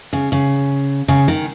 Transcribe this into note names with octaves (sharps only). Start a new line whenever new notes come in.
C#3
C#3
C#3
D#3